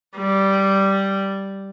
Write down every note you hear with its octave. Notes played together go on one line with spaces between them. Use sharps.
G3